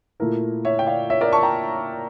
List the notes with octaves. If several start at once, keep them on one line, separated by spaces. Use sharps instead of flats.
A#2 A3 E4 A#4
C#5 E5
G5
D5 F5
C#5 E5
A#4 D5
A5 C#6
G5 A#5